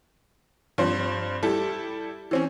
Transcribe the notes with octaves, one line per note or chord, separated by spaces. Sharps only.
G2 F3 C4 C5
G3 E4 G4 A4
E3 C4 C#4